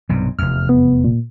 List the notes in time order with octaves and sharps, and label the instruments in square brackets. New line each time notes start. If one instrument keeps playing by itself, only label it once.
[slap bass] B1 G2 C3
[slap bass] F1 E2 [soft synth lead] F6
[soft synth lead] B3
A#2